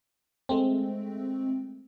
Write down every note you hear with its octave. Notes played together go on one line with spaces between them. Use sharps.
G#3 A3 C4